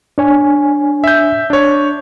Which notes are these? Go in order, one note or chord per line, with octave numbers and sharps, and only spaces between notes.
D4 C#5 G#5
E5 G6
D4 C#5